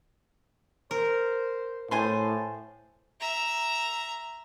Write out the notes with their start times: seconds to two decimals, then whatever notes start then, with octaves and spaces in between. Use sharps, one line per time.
0.91 A#4 C5
1.91 A2 C5 G#5 A5 C6
3.21 E5 A#5